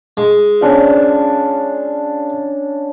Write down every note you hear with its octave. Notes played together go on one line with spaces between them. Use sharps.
G#3
C#4 D4 F5